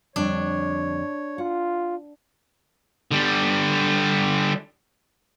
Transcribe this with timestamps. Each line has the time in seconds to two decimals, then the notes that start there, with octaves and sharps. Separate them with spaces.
0.16 F2 D3 G3 D4 C#5
1.38 F4 F#5
3.11 D3 G3